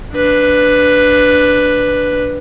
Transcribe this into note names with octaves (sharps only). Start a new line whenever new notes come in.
D4 B4